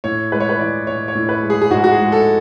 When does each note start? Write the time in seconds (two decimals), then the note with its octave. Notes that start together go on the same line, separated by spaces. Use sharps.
0.04 A2 C#5
0.32 G#3 B4
0.40 C#5
0.49 B4
0.60 E3 D5
0.87 A2 C#5
1.08 C#5
1.15 A2
1.29 B4
1.43 G#3
1.50 G#4
1.62 G#4
1.70 G#2 F#4
1.84 F#4
1.92 G#4
1.98 G#3
2.12 A4